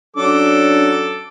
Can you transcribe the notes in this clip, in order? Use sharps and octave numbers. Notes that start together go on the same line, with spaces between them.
F#3 C#4 D4 A4 D6